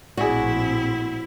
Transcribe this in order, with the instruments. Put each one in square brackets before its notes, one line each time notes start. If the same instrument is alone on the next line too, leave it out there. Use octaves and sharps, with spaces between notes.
[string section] A#1 A2 C4 [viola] E4 [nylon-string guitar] F#4 [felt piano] G#4 D5